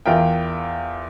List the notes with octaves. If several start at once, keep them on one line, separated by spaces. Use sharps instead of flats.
E2 F4 A#4 E5 G5